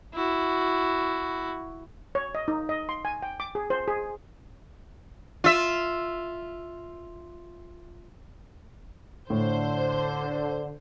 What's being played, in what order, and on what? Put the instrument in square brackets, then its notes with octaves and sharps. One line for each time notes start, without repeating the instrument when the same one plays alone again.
[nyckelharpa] E4 F#4
[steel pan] C#5
D#5
D#4
D#5
C6
G#5
G5
D6
G#4
C5
G#4
[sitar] F4 E5
[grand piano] A2 [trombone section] D3 [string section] C5